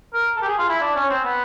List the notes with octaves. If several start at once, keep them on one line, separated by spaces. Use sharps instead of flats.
A#4
A4
G4
G#4
F4
E4
D4
C#4
C4
B3